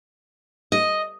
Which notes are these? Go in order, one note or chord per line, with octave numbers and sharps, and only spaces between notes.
D#5